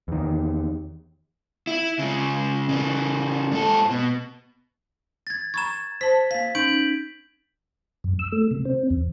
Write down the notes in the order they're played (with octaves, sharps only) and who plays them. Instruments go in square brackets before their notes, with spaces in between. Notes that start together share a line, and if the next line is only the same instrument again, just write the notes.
[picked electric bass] E2 D#3
[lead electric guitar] E4
C#3 G#3
C#3 E3
G#2 A4
B2
[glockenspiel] G#6 A6
[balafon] A#5 B5 C#6 [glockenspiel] G#6 E7
[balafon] C5 A5 [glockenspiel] B6
[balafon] A#3 F5 [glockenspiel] B6
[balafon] C#4 D#4 [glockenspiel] G6 D7 F#7
[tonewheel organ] F#2
E6
A3
C3
C4
E2